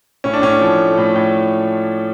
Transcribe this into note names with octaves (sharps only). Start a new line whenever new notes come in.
A2 C#4
D4
A2 C#4
F3
A3
A2
A2